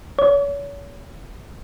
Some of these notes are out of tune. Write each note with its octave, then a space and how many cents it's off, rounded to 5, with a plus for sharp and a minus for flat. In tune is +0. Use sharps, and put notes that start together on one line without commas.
C#5 +35